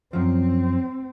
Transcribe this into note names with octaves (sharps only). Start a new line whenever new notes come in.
F#2 F3 C4